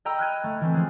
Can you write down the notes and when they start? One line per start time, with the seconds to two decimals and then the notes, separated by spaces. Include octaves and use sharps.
0.05 D#5 G5 A#5 B5 E6
0.19 F6 F#6 G#6 D#7
0.44 A3
0.61 E3 A3 C4
0.74 F3 G#3